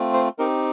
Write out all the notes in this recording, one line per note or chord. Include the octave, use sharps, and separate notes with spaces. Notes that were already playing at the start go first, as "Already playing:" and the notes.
Already playing: A3 C4 F4
C5
C4 D#4 G4 A#4